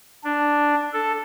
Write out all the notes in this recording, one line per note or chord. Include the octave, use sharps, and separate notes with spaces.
D4
A4